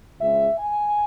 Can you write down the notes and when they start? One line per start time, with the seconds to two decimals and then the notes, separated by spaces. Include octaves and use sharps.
0.18 C#2 C#3 G#3 E5
0.59 G#5